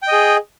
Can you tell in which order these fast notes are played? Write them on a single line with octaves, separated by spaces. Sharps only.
G5 D#5 G#4